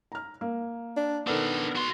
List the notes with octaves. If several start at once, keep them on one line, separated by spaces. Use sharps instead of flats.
A#5 F6
A#3
D4
D#3 B3 D4 A4 A#4
F#4 C6